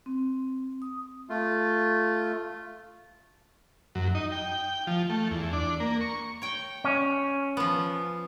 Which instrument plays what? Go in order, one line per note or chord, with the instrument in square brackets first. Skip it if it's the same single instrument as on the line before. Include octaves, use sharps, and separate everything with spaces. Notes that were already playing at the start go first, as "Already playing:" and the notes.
[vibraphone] C4
D#6
[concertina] A3 F4
[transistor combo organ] F#2
D#4
G5
F3
A3
E2
D4
A#3
C#6
[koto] C#5 G5
[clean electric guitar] C#4
[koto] F3 B3